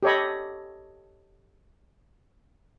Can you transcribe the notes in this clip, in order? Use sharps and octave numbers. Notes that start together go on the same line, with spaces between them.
G4 A4 C#5 D#5 B5